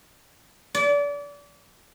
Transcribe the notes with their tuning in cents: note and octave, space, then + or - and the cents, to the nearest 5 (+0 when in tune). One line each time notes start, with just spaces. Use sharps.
D5 -30